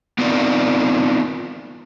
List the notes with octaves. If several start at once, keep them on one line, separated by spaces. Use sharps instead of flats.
B3 C4 D#4 F4 A#4 D5